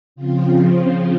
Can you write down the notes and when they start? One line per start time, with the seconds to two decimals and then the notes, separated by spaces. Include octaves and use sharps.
0.16 C#3 F3 C4 F4